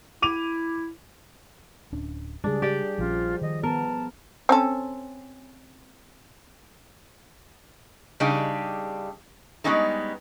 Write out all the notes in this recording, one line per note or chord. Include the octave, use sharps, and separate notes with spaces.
E4 D6 D#7 F7
D1 C#4 D4
C#3 G3 G#3 D4 G#4
G4 D5 G5
A#1 F3 C#4 F4
D#3 D#5
B3 A#4 A5
C4 C#4 A4
C#3 G3 D4 D#4 G4 G#4
G3 G#3 B3 C#4 D#4 A4